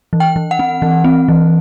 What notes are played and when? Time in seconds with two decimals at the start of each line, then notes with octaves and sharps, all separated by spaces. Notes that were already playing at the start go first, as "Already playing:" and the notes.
0.13 E3
0.20 G5
0.36 E3
0.51 F#5
0.59 C4
0.82 E3
1.04 C4
1.28 E3